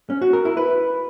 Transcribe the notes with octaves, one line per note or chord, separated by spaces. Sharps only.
C#4
F#4
A#4
E4
B4